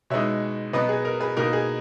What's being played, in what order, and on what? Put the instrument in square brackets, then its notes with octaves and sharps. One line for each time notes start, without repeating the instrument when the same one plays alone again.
[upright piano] B2 G#3 D#4 C#5 E5
B2 F#3 B3 B4 D#5
G#4
A#4
G#4 B4
B2 A#3 D#4 A#4
G#4